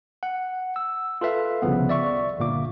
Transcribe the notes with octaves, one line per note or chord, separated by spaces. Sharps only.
F#5
E6
F4 A4 B4 E5 F5
G1 C2 C#3 F3 B3
D5 E5 C#6
G1 A#2 A#3 D6